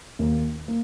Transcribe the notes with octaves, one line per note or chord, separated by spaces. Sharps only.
D#2 D#3 A#3
A#3